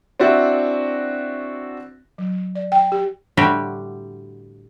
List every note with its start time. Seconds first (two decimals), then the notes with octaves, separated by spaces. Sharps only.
0.20 C4 D4 E4 F#4
2.18 F#3
2.55 D5
2.72 G5
2.92 G4
3.37 A2 D3 G3 F#4 G4